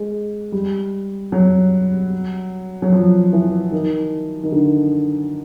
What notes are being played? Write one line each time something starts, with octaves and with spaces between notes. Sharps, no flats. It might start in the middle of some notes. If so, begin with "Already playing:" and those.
Already playing: G#3
G3
F#3
F#3
F3
E3
D#3
D#3
D3